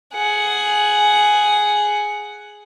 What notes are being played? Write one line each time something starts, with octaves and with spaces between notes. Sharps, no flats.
G#4 F#5